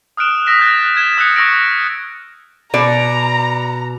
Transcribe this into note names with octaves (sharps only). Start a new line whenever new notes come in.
D#6 F6 F#6 D7 E7
D#6 E6 A#6 B6 E7
F#6 G6 A6 A#6
F6 G#6 E7
D#6 E6 F#6 G6 C#7 E7
C#6 E6 A#6 D7
B2 D5 A#5